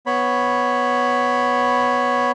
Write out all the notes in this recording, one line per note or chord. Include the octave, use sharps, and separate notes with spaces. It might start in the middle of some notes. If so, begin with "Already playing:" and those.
B3 C#5 B5